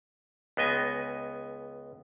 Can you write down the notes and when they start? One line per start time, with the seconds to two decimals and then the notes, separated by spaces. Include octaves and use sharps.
0.57 C#2 B3 D#5 G#5